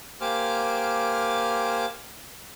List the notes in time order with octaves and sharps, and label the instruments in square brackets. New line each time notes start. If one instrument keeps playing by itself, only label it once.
[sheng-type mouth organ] A#3 G4 C5 G#5 D6 F6